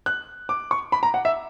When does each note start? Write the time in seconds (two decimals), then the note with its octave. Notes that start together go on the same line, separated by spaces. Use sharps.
0.06 F#6
0.49 D6
0.71 C#6
0.92 B5
1.03 A#5
1.14 F#5
1.25 E5